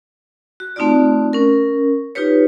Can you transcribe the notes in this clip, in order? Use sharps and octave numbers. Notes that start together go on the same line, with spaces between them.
F#4
A3 C4 D#4 F4 F#4 D5
C#4 A#4
D#4 F4 G4 B4 C#5